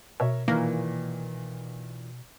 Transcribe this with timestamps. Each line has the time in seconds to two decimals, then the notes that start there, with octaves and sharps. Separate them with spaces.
0.20 B2 A#4 C#5 E5
0.48 A#2 D#3 E3 A#3